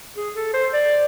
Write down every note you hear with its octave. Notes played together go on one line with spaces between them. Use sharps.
G#4
A4
C5
D5